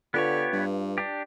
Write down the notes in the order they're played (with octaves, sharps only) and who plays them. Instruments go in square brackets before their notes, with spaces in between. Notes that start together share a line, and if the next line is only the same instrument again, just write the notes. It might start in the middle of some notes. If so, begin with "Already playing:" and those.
[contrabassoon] D3 [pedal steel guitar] B3 G4 C#5 [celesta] F4 B4 F5
[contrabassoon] G2
[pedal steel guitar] D4 G4